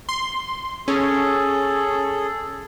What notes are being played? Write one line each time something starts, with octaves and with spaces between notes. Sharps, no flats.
C6
C#4 G#4 A4